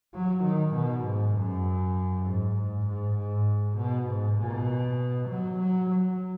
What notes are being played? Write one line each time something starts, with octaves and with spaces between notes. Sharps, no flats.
F#3
D#3
B2
G#2
F#2
G#2
G#2
G#2
G#2
B2
G#2
B2
F#3
F#3
F#3